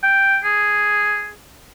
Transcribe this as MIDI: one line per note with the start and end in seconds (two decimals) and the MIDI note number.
0.03 0.38 79
0.44 1.32 68